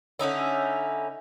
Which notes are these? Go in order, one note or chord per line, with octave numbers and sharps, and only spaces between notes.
D3 C#4 D#4 E4